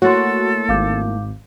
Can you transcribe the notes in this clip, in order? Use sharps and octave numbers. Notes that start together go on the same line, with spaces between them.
A3 A#3 E4 F#4 A4 C#5 C6
G#1 F5 D6 G6